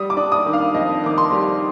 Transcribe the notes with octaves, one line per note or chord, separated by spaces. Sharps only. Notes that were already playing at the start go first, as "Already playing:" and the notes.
Already playing: G3 D#6
D6
D4
D#6
D#3
F5
F2 D#5
D#3 D6
C6
G3